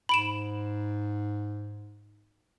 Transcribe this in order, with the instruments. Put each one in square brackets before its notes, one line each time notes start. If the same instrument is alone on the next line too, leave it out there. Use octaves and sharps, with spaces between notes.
[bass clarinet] G#2 [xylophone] B5 D7 E7